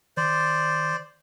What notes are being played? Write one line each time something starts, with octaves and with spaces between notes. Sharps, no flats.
D#3 C5 D5